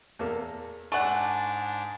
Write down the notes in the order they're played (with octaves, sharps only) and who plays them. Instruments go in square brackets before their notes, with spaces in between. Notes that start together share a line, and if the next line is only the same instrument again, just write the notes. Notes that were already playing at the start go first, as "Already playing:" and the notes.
[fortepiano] E2 A#3 A4
[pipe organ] G#2 D4 [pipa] A4 F#5 [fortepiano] D5 C#6 [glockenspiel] G#5